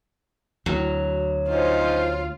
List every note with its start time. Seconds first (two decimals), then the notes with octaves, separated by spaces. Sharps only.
0.66 D2 F#3
1.49 C#4 D#4 F4 C5